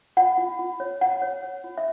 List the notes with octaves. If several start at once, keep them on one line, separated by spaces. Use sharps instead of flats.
F4 F#5
F4
F4
C#5
F4 F#5
C#5
C#5
F4
E5